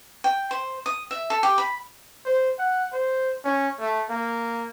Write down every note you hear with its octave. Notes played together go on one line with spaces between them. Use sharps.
G5
C5
D#6
E5
A4
G4
B5
C5
F#5
C5
C#4
A3
A#3